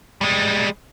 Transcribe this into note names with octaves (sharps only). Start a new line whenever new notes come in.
G3 G#3